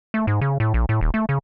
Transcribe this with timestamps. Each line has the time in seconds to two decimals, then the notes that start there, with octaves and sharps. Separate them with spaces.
0.14 A3
0.27 G#2
0.41 C#3
0.60 A2
0.74 A#1
0.89 A2
1.01 D#1
1.14 A3
1.29 C#3